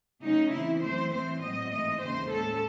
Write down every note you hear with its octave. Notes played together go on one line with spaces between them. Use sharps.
C#3 F#3 A3 C#4 D#4
C#3 E3 C4 E4
F#2 E3 A3 C4 C5
A2 E3 C4 C5
A2 F#3 C4 D#5
G#2 E3 A3 C4 D#5
D#2 C#3 E3 C4 C5
A2 G#3 C#4 A4